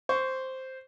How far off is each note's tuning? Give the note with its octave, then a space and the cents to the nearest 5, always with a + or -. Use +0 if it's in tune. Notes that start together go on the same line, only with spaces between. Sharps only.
C5 +0 C#6 +20